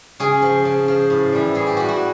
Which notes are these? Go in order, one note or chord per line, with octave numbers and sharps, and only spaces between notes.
C#3 G#4
F3
C#3
F3
A2
E3 G3
A2 G#4
G4
E3 G3 F#4
F#4